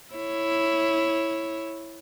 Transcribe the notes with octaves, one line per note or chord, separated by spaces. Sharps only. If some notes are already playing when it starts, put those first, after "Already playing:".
E4 C#5